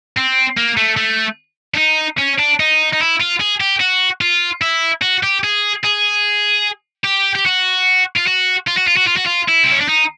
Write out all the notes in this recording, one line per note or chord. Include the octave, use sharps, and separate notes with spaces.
C4
A#3
A3
A3
D4
D#4
C#4
D4
D#4
D#4
E4
F4
G#4
G4
F#4
F4
E4
F#4
G4
G#4
G#4
G4
G4
F#4
F4
F#4
F4
F#4
F4
F#4
F4
F#4
F4
E4
C4
C#4
D4
D#4